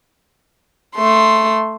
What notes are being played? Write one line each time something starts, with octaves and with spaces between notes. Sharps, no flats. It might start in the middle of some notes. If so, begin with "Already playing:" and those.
A3 C6